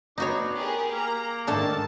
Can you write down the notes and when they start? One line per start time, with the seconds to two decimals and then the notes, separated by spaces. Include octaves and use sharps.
0.18 B3 D4 D#4 F#4 C#5
0.55 G4 G#4 A#4
0.93 A#3 A#5
1.47 G#2 D#3 A3 D4 A4 A5